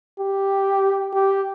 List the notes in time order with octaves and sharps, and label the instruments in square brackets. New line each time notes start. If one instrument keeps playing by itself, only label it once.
[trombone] G4
G4